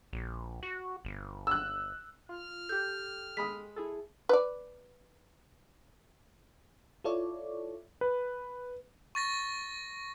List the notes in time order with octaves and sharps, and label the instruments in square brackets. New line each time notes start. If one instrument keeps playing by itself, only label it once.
[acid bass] A#1
F#4
G1
[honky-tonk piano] E6 F#6
[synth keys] F4 [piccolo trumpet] F6
[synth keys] G4 A4 [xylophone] G6
[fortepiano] G#3 B5 D#6 [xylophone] B6
[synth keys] E4 G#4 A4
[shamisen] B4 D5
[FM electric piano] E4 F4 A4 C#5 D5
[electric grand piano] B4
[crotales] C#6 A6 A#6